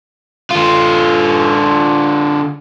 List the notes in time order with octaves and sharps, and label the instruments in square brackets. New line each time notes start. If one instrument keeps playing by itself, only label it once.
[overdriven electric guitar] D3 F4